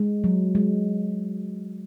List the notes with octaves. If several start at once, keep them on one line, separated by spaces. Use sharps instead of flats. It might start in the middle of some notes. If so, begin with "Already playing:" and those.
Already playing: G#3
F#3
G#3